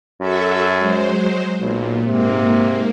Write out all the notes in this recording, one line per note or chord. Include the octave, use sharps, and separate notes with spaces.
F#2 F#4 A4 E5
F#3 G#3 C5
B1 A#2
G#2 C3 A#3